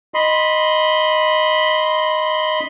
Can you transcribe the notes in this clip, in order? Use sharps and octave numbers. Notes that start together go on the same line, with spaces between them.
D#5 B5 C6